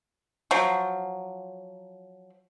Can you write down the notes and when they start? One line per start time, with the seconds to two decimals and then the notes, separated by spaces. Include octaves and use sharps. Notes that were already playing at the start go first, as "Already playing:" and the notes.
0.51 F3 F#3